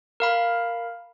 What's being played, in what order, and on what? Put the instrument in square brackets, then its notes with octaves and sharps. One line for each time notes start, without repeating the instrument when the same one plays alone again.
[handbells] A#4 F5 B5